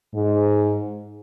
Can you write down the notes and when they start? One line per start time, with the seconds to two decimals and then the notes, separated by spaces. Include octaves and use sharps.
0.14 G#2